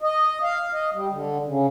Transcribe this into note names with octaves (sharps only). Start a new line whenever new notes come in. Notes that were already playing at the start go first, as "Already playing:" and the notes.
D#5
F5
D#5
G3
D3
C#3